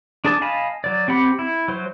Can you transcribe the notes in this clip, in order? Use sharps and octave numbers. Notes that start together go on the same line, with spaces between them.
D4 G#4 A5
D#5 F5 G#5 A5 B5
F#3 D5
C4 G4 F#5 B5
E4
F#3 C5